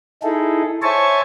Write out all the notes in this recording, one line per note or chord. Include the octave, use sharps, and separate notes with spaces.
D#4 E4 G#4 A4
C5 C#5 E5 G#5 A5 C#6